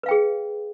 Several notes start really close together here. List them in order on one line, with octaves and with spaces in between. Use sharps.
B4 F5 G5 G#4